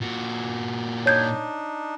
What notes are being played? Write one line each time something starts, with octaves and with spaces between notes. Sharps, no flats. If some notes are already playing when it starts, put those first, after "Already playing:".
A#2 F#4
D4 D#4 C#5 G6 G#6